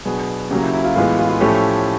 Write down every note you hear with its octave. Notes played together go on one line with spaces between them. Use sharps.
B2 F#3 B3 D4 G#4
C#3 F#3 A#3 G4
E4
E4
F4
A2 E3 G#3 B3 F4
F4
F4
A2 F3 A3 C#4 G4